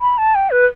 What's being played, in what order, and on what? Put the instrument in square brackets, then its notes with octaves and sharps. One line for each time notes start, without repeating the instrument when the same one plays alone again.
[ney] B5
A5
G5
B4